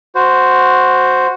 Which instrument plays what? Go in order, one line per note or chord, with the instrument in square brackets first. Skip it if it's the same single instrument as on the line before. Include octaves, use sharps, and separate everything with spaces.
[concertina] F#4 C5